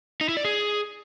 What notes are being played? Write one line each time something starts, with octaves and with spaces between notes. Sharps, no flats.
D#4
E4
D5
G#4